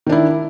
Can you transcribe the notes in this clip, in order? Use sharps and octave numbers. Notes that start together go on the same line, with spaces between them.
D#3 D4 E4